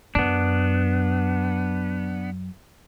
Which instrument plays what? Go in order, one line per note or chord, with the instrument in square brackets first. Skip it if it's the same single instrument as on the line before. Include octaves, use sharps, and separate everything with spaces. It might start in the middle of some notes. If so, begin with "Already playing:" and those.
[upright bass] F#2 [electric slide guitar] B3 D4